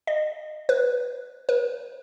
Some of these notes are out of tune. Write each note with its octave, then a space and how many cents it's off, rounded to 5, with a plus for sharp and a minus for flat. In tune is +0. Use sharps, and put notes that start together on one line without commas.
D#5 -25
B4 -5
B4 -35